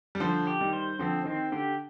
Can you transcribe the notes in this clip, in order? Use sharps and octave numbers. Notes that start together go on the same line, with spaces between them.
G3
D3 F3 C5
G4
D#3 G3
C5
D3 F3 C4
D#3 C4
D3 G4